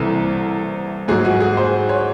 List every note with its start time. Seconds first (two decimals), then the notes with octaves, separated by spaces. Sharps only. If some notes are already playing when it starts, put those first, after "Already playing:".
Already playing: C2 C3 E3 A4
1.08 G#2 G#4
1.11 F#3
1.25 F#4
1.40 G#4
1.57 C5
1.89 C#5